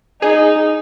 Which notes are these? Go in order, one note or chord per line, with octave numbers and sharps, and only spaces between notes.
D#4 G#4